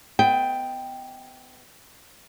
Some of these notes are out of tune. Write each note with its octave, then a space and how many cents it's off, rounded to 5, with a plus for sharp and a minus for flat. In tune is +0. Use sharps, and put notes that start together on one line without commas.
B3 +30 D#5 +25 G5 +0